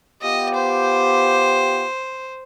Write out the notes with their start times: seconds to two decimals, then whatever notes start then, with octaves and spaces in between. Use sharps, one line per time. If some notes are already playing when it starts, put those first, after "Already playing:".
0.22 B3 F4 G4 D#5
0.55 C5